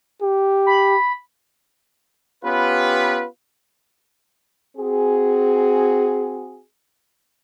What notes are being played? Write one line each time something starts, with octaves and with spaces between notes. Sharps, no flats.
G4
B5
B3 C#4 F4 G4 B4
C4 F#4 G#4